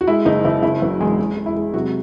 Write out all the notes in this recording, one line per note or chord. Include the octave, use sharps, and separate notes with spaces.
F#4
G#3 E4
F#1 D#4
F#1 E4
F#1 E4
F#1 F#3 F#4
E2 G#3 G#4
G#3
G#3
E4
G#3
C3 F#3 F#4